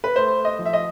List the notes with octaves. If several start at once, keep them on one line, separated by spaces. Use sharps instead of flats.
B4
A3 C5
D#5
F3
E5
D#5